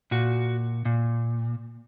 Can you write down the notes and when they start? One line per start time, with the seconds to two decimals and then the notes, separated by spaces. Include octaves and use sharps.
0.11 A#2 F#4
0.85 A#2